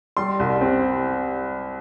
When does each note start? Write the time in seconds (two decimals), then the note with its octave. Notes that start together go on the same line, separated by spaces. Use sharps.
0.17 G3 C6
0.40 C2
0.61 C4